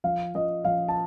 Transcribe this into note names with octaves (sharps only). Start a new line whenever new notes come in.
F3 F5
F3 D#5
F3 F5
A5